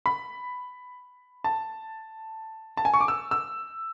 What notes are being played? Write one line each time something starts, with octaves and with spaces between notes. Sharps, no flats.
B5
A5
A5
G#5
C#6
D6
E6
E6